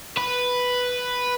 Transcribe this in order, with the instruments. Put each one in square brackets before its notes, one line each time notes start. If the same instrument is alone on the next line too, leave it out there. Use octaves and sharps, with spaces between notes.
[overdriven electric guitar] B4